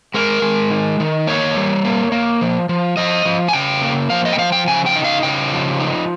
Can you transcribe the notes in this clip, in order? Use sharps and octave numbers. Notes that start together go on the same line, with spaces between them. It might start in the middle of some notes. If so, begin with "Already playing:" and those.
G#3 A#4
G#3
D#3
D#3
A#3 C#5
G3
A#3
A#3
F3
F3
F3 D#5
F3
G#5
C#3 G5
A#3
F3 F5
D#5
G5
F3 F5
G5
C#3 G#5
G5
D#4
F5
C#3 G5
F3
D#4